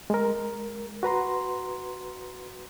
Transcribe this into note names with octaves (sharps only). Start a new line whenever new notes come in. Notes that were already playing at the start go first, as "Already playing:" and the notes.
G#3 A#4
F#4 B4 A#5 C6